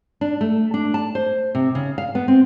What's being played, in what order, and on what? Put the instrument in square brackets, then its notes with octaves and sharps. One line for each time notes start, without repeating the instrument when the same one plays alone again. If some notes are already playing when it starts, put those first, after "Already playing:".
[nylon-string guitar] D4
A3
D4
A5
C5
C3
C#3
F5
B3
C4